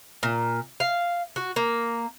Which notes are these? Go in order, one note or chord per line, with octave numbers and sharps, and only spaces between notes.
A#2
F5
F#4
A#3